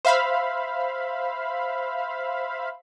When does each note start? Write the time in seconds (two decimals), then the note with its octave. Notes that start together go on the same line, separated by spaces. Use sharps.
0.05 C5 E5 F5 B5